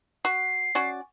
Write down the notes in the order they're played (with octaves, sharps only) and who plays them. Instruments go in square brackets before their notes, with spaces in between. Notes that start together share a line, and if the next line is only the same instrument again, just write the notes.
[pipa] F#4 [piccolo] C7
[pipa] C#4 F#4 D5